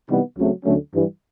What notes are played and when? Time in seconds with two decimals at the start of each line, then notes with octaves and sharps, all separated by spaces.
0.08 C3 E3 G3 B3 D#4
0.36 C#2 C#3 F#3 A3 C4
0.64 D2 D3 F#3 A3 C#4
0.92 G2 E3 G3